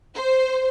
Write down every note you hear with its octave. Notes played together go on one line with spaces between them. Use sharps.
C5